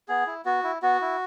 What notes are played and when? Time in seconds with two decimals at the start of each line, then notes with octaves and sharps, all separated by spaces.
0.08 B3 G#4
0.27 E4
0.45 B3 F#4
0.63 E4
0.82 B3 F#4
1.01 E4